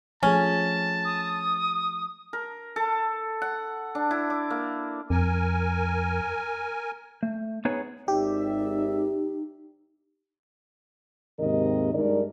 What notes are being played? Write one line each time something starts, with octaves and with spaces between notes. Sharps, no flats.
F3 A3 C#4 G#4 A5
D#6
A#4
A4
F#5
D4
E4
D6
A#3
F2 A#4 G#5
A3
B3 D#4 G#4 B4 C#5
G#1 D#4 G4 D5 E5
D#2 G#2 C3 D#3 A#4 D#5
G2 G#3 D#4 A#4 D5